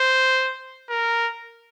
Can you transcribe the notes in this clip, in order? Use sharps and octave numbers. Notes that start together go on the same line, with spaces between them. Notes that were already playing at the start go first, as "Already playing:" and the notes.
Already playing: C5
A#4